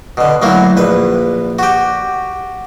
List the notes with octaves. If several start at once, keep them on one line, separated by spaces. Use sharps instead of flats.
B2 D3
D2 F#3 A#3 E4
A#1 B4
F#4 G4